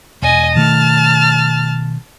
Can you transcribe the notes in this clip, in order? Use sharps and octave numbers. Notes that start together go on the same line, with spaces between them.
E1 D#5 G#5
B2 D#3 A3 A5 F6